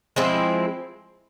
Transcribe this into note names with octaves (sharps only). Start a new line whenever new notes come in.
F3 G#3 C4 E4